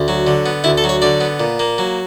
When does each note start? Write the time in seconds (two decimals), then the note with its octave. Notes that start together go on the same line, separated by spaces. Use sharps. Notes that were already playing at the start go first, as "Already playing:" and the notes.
Already playing: D2
0.08 F#3
0.27 D3
0.46 B3
0.64 D2 E4
0.78 A4
0.84 F#3
0.89 C#5
1.02 D3 D5
1.21 B3
1.40 A#2
1.60 A#3
1.78 F#3